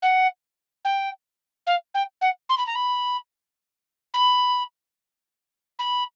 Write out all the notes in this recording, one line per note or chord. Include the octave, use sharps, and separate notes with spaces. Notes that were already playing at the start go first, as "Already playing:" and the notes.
F#5
G5
F5
G5
F#5
C6
B5
A#5
B5
B5
B5